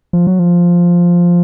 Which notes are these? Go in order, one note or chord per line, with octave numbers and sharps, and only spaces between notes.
F3
F#3
F3